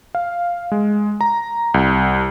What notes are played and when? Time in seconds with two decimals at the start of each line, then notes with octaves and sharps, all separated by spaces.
0.15 F5
0.72 G#3
1.21 A#5
1.74 C2